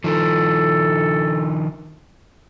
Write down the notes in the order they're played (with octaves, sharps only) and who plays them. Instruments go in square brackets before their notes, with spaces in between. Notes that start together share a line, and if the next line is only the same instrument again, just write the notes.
[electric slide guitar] D#3 F3 [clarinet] A4